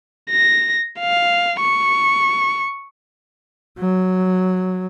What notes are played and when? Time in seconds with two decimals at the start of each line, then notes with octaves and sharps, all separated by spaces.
0.30 A#6
1.00 F5
1.61 C#6
3.79 F#3